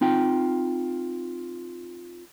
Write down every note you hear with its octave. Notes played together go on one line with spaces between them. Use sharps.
C4 D#4 F4 G5